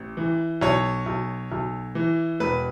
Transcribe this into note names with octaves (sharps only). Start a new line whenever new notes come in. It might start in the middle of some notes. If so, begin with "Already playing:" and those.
Already playing: A1
E3
B1 C#5
B1
B1
E3
E1 B4